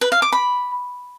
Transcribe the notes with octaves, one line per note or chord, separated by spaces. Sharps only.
B4
F5
D6
B5